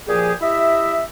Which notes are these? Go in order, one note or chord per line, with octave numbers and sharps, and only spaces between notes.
A#2 F3 G4 G#4
E4 G4 D#5 E5